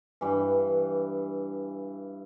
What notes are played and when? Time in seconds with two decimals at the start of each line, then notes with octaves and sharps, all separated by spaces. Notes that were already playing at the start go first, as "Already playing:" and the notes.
0.21 G2 E3